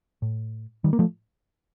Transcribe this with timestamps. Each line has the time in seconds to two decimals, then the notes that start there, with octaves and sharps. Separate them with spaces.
0.22 A2
0.84 D#3 G3
0.93 A#3
0.99 F3 A3